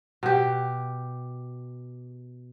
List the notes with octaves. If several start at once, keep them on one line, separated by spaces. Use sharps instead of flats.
B2 G4